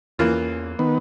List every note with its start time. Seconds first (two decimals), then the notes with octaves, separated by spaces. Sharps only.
0.19 E2 E3 A#3 C#4 F4
0.79 D#3 B3